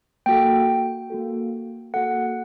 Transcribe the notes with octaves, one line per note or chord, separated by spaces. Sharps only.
A#3 F#4 A4 G5
A#3 F#4 A4
A#3 F#4 A4 F#5